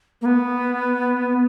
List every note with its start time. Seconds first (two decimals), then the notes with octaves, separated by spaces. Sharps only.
0.22 A#3
0.26 B3